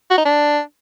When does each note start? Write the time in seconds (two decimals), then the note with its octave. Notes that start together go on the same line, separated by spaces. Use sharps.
0.10 F#4
0.18 D#4
0.25 D4